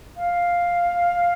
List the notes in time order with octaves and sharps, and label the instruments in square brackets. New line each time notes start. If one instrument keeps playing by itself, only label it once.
[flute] F5